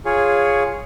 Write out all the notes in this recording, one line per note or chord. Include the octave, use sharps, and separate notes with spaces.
F4 G#4 C#5